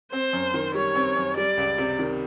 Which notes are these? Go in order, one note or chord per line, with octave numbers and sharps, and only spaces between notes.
C4 C5
F#2
D#3
G3 C#5
C4
F#2
G3 D5
C#2
C3
D#3